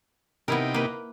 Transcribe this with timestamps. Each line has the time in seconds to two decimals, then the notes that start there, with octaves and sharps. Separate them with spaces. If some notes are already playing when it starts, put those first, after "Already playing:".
0.48 C3 B3 D#4 E4 G4 A#4
0.74 A#3 B4